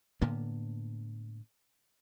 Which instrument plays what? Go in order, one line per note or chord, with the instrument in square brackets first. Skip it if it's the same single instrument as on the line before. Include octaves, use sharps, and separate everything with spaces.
[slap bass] A2 D3 A#3 B3